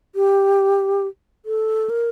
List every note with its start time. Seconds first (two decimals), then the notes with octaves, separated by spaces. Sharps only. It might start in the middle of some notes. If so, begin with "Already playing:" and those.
0.15 G4
1.46 A4
1.90 A#4